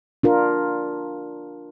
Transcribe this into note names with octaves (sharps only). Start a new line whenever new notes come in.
D4 F4 A#4